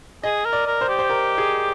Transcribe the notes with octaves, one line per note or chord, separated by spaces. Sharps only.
G#4 D#5
A#4
D5
A#4
C5
G4
C5
A#4
G#4